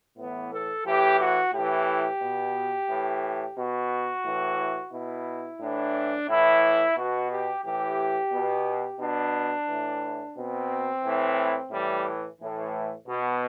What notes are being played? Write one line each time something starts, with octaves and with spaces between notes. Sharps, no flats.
A2 E3 B3
A4
A2 E3 G4
F#4
A2 E3 G4
B2
A2 E3
B2 F#4
A2 E3
B2 E4
A2 E3 D4
A2 E3 E4
B2 F#4
G4
A2 E3 G4
B2
B2 D4
A2 E3
B2 C4
A2 E3
A2 E3 G3
A2 E3
B2